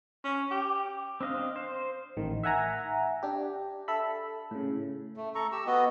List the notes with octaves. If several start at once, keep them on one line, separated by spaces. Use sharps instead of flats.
C#4
G4
C4 D4 D#5 F5
C5
A1 D#3
E5 F#5 G#5 A#5
D4 G4
A4 E5 B5
A2 C#3
A3
A4 A#5 C#6
G4 E6
B3 F#4 D#5